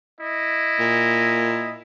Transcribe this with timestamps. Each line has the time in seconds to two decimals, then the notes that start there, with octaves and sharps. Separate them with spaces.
0.19 E4 D#5
0.80 A#2